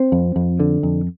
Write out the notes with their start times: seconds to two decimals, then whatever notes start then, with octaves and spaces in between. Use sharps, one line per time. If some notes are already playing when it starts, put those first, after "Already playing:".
Already playing: C4
0.12 F2
0.36 F2
0.60 D3
0.83 F2